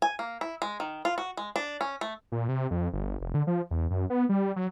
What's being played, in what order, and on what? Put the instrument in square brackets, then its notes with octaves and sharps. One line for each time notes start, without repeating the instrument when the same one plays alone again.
[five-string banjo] G#5
A#3
E4
G#3
D#3
F4
F#4
G#3
D4
C#4
A3
[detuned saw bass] A#2
C3
F2
G1
F1
D3
F3
E2
F#2
B3
G3
F#3